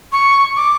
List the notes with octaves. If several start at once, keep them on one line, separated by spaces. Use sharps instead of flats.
C#6
D6